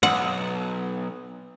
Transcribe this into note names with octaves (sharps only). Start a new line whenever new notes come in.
B1 F#5